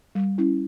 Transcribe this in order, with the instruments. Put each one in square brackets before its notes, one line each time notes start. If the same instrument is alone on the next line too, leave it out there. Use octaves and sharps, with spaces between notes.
[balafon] G3
C#4 E4